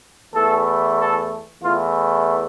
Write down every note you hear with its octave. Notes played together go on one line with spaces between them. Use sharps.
E2 E3 A3 A4
A4
E2 E3 A3 F4